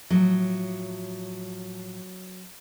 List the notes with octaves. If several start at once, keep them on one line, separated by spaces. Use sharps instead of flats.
A2 F3 F#3